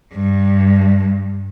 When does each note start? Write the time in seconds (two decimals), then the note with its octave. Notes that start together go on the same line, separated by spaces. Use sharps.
0.13 G2